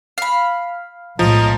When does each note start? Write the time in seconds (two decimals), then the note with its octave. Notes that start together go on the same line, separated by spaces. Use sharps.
0.18 F5 B5
1.19 B1 A2 F3 G#3 D#5 A#5